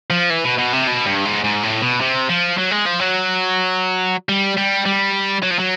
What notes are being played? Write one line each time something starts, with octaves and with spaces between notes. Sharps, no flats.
F3
E3
B2
B2
C3
B2
G2
G#2
G#2
A2
B2
C3
F3
F#3
G#3
F3
F#3
G3
G3
G3
F#3
F3
F#3